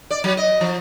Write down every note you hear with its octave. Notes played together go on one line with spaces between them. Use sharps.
D5
F#3
D#5
F3